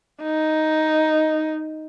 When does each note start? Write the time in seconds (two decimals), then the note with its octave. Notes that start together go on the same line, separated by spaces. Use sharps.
0.22 D#4